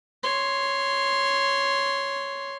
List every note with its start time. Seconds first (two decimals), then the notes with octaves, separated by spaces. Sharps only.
0.23 C#5 C6